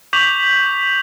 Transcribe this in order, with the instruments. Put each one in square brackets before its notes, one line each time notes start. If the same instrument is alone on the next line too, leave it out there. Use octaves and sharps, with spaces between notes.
[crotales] C#6 D6 G6 B6 F7 F#7